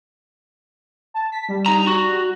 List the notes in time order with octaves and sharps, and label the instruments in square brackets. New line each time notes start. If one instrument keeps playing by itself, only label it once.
[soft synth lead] A5
B6
G3
[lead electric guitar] D#4 A#5
F#4